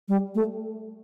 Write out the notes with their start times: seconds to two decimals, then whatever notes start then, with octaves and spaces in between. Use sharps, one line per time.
0.08 G3
0.35 A3